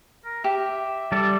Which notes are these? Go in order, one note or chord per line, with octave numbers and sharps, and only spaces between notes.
A#4
G4 E5
G3 A4 D5